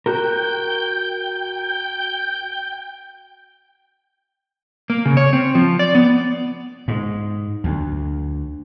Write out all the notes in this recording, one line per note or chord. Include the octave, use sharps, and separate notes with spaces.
F#4 A#4 G5 G6
A#3
C#3
C#5
C4
F3
D5
B3
G#2
D2